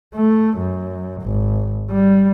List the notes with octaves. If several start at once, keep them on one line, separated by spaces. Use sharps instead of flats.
A3
F#2
G#1
G3